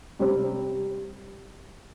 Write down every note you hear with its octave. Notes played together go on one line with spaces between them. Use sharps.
C3 G3 C4